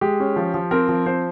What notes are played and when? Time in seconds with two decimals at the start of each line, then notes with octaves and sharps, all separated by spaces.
0.01 G#3 G4
0.20 C#4
0.36 F3
0.54 F3
0.71 C4 A#4
0.89 F3
1.06 C4 C5